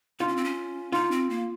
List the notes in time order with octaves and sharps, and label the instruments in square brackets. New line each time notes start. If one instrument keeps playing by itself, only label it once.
[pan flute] D#4 [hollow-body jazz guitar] F4
[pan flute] C#4
C4
C#4
[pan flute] D#4 [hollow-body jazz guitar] F4
[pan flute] C4
A#3